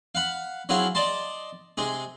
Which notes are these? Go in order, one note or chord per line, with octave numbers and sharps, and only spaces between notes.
F5 F#5 B5
F#3 C4 E4 G#4 F5
D5 D#5 A5 C6
C3 G#3 G#4